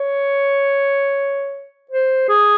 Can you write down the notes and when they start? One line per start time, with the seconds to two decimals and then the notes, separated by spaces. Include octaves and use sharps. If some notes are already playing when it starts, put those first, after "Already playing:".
Already playing: C#5
1.91 C5
2.29 G#4